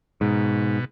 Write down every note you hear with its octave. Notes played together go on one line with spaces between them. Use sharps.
G#2 B2